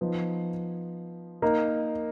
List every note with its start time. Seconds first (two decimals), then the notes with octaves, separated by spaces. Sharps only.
0.01 F3 B3 D#4
1.42 A#3 D#4 A#4